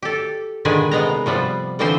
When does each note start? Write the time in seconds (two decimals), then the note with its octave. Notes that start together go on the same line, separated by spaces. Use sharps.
0.02 G4 A4
0.65 A#2 D3 D#3 G#3 B4 G#5
0.91 C3 G#3 B3 A#5
1.26 C3 F3 G3 B3
1.79 A2 D3 E3 F3 C4 C5